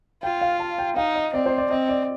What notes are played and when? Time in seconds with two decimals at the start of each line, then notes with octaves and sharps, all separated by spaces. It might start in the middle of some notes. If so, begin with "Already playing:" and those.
0.23 F4 G5
0.41 F5
0.60 A5
0.78 G5
0.96 D#4 F5
1.16 D#5
1.33 C4 D5
1.46 C5
1.58 D5
1.71 C4 D#5
1.89 D5